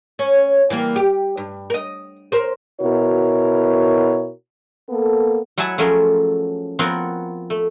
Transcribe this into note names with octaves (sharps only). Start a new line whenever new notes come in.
C#4
E3 G3 A#3
G4
G2
A#4 D#5
A#4 C5
B2 E4 F#4 A#4 C#5
A#3 B3 A4
F#3 E4 F#4 F#5 G#5 A5
F3 F#3 A3 C#4 G#4 A#4
F3 B3 C4 F#4 A#4 C#5
A3